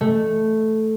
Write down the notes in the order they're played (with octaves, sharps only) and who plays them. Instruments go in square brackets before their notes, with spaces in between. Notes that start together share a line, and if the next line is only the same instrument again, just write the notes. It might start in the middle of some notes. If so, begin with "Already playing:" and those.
[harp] A3